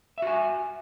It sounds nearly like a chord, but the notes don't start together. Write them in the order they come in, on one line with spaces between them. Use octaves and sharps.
E5 F#4 G#5